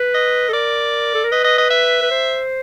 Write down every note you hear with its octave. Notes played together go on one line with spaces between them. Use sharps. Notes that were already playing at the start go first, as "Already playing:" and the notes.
Already playing: B4
D#5
A4
A#4 D5
A4
A#4
B4 D#5
D#5
D#5
E5
B4
C5